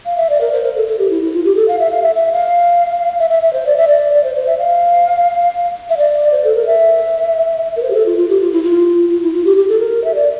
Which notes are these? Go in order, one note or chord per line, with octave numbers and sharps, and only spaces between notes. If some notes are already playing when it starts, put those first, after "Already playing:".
F5
E5
D5
A#4
C5
A#4
A4
A4
G4
E4
E4
F4
G4
A4
F5
E5
F5
E5
E5
F5
E5
E5
E5
C5
D5
E5
D5
D5
C5
C5
E5
F5
E5
D5
C5
A4
A#4
E5
A#4
C5
G4
A4
F4
F4
G4
F4
E4
F4
F4
E4
F4
G4
G4
A4
A#4
E5
D5